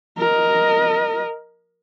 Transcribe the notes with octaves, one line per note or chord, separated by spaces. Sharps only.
A#4 D#5